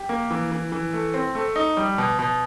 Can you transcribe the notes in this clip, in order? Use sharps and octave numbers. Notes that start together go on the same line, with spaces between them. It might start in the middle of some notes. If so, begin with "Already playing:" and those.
Already playing: G4
A#3
E3
E3
E3
A3
C4
A3
D#4
G3
B2
B2